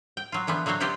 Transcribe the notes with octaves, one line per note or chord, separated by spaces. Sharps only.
G5
F#3 F4
D3 E3 F3 B3
D3 F#3 F#4 C5 C#5
B3 E4 F4 G4 C5 D5